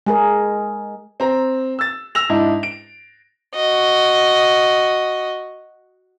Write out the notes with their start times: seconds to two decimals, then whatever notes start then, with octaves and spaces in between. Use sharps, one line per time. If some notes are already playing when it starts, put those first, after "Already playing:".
0.06 G#3 G#4 A#4
1.20 C4 A#5
1.79 E6 A6
2.15 E6 A#6 F7
2.29 G#2 D4 E4 D#5
2.63 D7
3.55 F#4 D#5